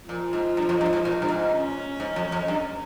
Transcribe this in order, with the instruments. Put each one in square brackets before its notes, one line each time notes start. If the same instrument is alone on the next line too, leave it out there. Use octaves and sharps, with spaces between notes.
[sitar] A#2 [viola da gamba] F3
[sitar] G#2
G2
F2
G2
G#2
A#2
G2
G#2
[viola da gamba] C#4
[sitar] G#2
F2
F2
G2